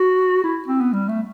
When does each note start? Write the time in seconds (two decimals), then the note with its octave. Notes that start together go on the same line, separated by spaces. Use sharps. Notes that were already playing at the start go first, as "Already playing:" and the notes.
Already playing: F#4
0.44 E4
0.68 C4
0.81 B3
0.93 G3
1.09 A3